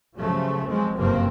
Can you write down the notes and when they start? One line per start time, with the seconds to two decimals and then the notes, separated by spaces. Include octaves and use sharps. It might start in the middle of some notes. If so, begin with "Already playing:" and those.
0.17 G2 C#3 F3 F#3 A3
0.68 F3 F#3 G#3 C4
0.97 F#1 G2 C3 F3 A#3 C4